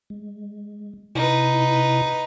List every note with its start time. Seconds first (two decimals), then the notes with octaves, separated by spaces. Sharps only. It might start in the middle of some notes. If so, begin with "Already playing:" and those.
0.10 G#3
1.15 C3 D#4 E4 B4